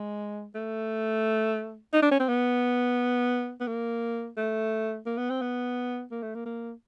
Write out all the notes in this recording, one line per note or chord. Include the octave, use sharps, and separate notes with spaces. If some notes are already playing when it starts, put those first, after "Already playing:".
Already playing: G#3
A3
D#4
D4
C#4
C4
B3
B3
A#3
A3
A#3
B3
C4
B3
A#3
A3
A#3
A#3